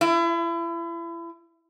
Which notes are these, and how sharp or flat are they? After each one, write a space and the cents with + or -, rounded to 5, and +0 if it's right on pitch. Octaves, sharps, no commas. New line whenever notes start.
E4 +35